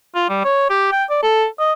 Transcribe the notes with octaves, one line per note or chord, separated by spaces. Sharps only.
F4
G3
C#5
G4
G5
D5
A4
D#5